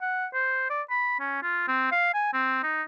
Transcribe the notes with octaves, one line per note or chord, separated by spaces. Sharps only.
F#5
C5
D5
B5
C#4
F4
C4
F5
G#5
C4
D#4